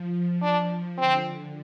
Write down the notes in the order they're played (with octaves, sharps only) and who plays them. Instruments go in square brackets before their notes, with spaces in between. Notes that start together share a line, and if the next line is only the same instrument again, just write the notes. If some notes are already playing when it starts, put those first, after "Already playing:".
Already playing: [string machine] F3
[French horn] D4
[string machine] D3 [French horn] C4